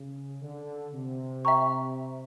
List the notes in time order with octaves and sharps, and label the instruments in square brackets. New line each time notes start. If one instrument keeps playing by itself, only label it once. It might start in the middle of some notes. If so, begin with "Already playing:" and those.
Already playing: [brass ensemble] C#3
D3
C3
[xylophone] E5 G5 A#5 C#6